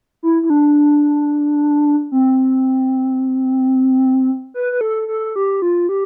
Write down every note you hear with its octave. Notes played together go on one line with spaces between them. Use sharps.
E4
E4
D4
C4
B4
B4
A4
A4
G4
F4
G4